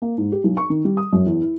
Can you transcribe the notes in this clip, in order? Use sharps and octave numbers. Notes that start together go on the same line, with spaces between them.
A#3
G#2
G4
B1
C#6
D#3
G3
D#6
F#2
E2
E4